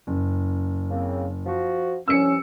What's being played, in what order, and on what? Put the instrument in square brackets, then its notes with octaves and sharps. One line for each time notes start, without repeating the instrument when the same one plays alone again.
[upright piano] F#1
[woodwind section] C#3 A#3 C4
F3 F#4
[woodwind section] C2 G2 F3 [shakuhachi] C#4 [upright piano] E6 C#7